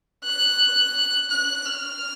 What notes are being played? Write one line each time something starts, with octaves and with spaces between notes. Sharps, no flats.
F#6
F#6
F6